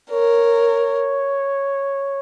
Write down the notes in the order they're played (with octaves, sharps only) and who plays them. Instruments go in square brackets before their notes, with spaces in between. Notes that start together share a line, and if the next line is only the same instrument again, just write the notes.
[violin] A#4 [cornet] C#5